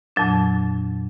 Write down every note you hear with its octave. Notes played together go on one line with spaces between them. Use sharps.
F2 A#2 F#3 D4